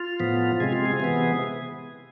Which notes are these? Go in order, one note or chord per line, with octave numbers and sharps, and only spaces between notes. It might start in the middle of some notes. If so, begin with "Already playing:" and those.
Already playing: F4
A2 F3 B3
C3 G#3 C4 G#4
F4
G#4
C3 E3 B3